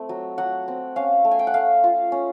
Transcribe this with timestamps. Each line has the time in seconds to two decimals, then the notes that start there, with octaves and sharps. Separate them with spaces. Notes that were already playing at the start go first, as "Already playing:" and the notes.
Already playing: A3 C4
0.09 F#3
0.38 F#3 F#5
0.68 C4
0.96 C#4 F5
1.25 A3
1.31 G#5
1.39 G5
1.47 F#5
1.54 A3 F5
1.84 F4
2.12 C#4